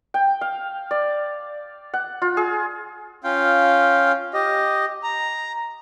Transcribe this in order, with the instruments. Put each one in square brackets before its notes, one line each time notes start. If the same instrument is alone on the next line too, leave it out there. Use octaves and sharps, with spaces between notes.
[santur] G5
F5
D5
F#5
F4
G#4
[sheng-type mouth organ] C#4 F4 F5 G5
G4 D#5
A#5